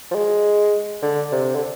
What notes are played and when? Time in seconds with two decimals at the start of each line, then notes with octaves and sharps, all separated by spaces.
0.11 F3
0.15 G#3
1.02 D3
1.32 C3
1.55 D3